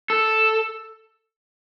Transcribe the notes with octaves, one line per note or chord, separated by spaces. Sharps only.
A4